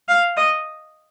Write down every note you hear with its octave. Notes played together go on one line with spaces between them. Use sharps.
F5
D#5